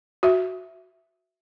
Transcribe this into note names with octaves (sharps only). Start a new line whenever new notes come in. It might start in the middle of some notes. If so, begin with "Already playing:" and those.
F#4 E5